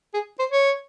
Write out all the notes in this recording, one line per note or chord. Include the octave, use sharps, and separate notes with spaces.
G#4
C5
C#5